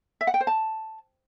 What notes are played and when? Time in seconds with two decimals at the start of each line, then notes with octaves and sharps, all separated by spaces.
0.21 E5
0.27 F#5
0.34 G5
0.41 C5
0.47 A5